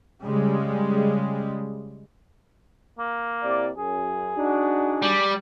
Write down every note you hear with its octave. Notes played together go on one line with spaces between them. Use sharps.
C#3 G3 G#3
A#3
C3 E4 D5
F#2 G#4
D4 D#4 F#4
G3